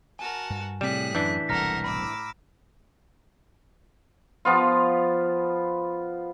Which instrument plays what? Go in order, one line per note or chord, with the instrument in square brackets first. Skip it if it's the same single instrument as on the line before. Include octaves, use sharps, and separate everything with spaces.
[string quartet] F#4 A#4 A5 [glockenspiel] G#5
[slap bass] G2
[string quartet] A2 G#4 F#6 [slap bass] C3 C4 [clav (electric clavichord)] G3 [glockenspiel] B6 E7
[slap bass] F#2 [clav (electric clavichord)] E3 D4 [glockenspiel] G6 B6
[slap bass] E1 C2 [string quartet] A4 A#4 F#5 [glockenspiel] A#5 F6 A#6
[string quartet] A2 D6 E6 [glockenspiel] B5
[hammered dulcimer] F3 B3 F4